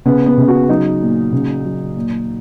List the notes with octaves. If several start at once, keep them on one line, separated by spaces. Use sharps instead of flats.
C#3 B3
B3
C#3
F#4
F#3 D#4
A#2
C#3
F#3
A#2